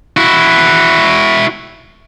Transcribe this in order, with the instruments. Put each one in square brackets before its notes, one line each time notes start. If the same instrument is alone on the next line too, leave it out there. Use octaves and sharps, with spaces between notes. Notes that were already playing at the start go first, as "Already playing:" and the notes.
[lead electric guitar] E4 F#4